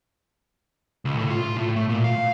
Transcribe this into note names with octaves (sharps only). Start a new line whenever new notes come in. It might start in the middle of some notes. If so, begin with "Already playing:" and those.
C#2
A2
F4
A2
A3
A#2
F5